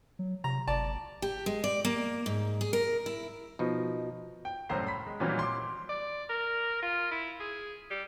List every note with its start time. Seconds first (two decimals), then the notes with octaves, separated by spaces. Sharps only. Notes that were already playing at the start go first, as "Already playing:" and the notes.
0.19 F#3
0.44 C3 A#5
0.67 G1 D5 A5
1.22 G4
1.46 G#3
1.64 D5
1.85 A#3
2.26 G#2
2.61 G#4
2.73 A#4
3.06 E4
3.59 B2 F3 D#4
4.45 G5
4.69 C2 F#2 A2 C5 A#5 C7
4.87 B5 B6
5.07 G#3
5.20 A#2 D#3 E3 F#3 G3 C4
5.39 C6 D6
5.89 D5
6.29 A#4
6.82 F4
7.11 E4
7.40 G#4
7.90 G3